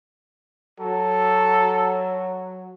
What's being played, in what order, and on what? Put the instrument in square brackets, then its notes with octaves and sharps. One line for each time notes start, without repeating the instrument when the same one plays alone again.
[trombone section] F#3 [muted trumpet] A4